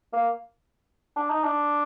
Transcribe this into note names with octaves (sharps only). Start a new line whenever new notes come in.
A#3
D4
D#4
D4